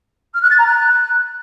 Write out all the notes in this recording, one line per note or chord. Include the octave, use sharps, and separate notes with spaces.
F6
F#6
A6
A#5
F#6